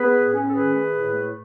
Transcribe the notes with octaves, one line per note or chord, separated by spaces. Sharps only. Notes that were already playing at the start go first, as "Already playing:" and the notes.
Already playing: B3 G#4 B4
A2
C#4
A4
D#3 G#4 B4
A3
A2
A3